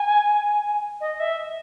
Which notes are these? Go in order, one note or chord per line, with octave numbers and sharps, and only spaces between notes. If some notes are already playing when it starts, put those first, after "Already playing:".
Already playing: G#5
D#5
E5